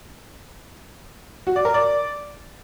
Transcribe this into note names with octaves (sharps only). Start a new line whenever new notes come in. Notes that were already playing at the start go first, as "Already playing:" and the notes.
F#4
D5
A#4
D5